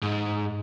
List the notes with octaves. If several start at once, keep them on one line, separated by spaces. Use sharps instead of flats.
G#2